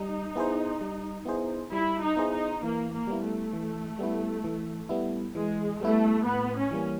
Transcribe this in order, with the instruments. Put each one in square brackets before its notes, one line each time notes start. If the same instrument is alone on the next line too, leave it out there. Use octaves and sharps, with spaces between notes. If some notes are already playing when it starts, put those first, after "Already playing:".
Already playing: [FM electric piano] G3 [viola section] D#4
[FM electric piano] B3 E4 G#4 C5
G3
B3 E4 G#4 C5
[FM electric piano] G3 [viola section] E4
[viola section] D#4
[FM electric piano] B3 E4 G#4 C5
[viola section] D#4
[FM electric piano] E3 [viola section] A#3
[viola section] A#3
[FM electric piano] G3 B3 E4
[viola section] A3
[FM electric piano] E3
G3 B3 E4
E3
G3 B3 E4
[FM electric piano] E3 [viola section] G#3
[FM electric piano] G3 B3 E4 [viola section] A3
[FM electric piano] A2 [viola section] B3
[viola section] C#4
[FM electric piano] E3 G3 A#3